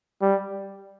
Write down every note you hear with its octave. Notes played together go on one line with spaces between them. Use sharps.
G3